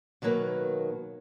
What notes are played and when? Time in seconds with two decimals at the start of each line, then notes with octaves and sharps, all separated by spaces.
0.22 B2 D#3 F#3 A#3 B4